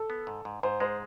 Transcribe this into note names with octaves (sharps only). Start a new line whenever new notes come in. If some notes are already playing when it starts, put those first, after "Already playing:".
Already playing: A4
B3
G#2
G#2
G#2 C5
G#3 C5